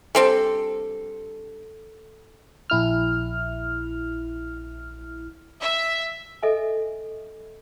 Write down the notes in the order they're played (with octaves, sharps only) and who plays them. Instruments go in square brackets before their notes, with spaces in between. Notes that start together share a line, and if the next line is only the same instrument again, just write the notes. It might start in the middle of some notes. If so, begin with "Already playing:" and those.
[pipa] G3 C4 D4 [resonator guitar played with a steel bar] A4
[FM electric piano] A#1 E4 F6
[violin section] E5
[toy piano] A4 D#5 E5 G#5